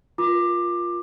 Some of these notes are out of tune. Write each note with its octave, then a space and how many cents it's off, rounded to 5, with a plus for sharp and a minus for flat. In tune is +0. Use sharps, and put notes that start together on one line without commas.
F4 +0 A#4 +25 D6 +15